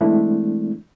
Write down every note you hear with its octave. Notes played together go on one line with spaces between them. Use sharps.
E3 G#3 A3 C4 D4 E4